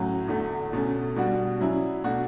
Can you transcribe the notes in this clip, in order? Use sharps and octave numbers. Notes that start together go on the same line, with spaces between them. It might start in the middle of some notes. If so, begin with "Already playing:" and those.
Already playing: A2 F#3 C#4 F#4
E2 D3 A3
B2 A3 C#4
B2 G3 D4 F#4
F#3 C#4 E4
B2 A3 D4 F#4